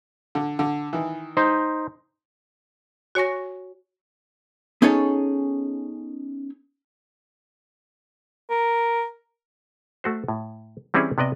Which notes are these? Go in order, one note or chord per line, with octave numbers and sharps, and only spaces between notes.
D3
D3
D#3 E3
D#4 C5
F#4 C#5 G#5 C#6 A#6
B3 C#4 D#4 G#4 A4 C#5
A#4
A3 F#4 C5
A2
E3 G3 C4 C#4 E4 G#4
C3 B3 D5 D#5